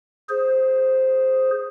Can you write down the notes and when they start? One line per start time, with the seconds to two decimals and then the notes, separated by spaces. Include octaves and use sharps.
0.29 G#4 C5